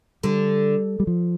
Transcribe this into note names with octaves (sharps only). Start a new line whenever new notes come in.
D3 G3
G3
F3